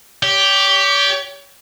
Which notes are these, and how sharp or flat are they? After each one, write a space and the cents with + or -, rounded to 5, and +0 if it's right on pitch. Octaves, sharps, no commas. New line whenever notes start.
G4 +0 C#5 +40